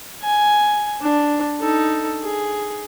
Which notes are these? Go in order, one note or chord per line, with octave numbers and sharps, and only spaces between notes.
G#5
D4
D#4 A4
G#4